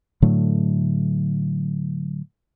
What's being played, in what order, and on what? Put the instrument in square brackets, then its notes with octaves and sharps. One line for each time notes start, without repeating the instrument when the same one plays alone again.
[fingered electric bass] A2 D3 F#3 A3